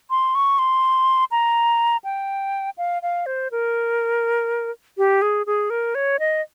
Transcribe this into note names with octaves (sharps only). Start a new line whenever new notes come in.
C6
C#6
C6
A#5
G5
F5
F5
C5
A#4
G4
G#4
G#4
A#4
C#5
D#5